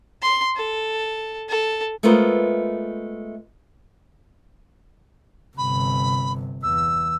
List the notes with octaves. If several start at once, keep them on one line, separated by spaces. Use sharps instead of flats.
C6
A4
A4
G#3 A3 B3 F4 A#4 C5
G1 C3 B5
E2 E6